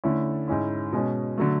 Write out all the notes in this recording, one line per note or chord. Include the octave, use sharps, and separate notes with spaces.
D3 A3 C#4 E4
G#2 G#3 C#4 E4
B2 G#3 C#4
D3 F#3 A3